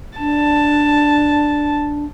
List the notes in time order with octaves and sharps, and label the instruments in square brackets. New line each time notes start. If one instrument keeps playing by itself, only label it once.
[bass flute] D4 [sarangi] A5